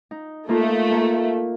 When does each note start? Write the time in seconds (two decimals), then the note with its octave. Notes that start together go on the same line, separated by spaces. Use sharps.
0.11 D#4
0.49 A3 A#3 D#4 F4
0.92 A#3